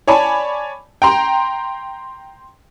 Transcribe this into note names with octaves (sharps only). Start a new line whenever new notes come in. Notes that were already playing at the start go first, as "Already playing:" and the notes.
C#5 D5 G#5 A5 B5
G5 A#5 C6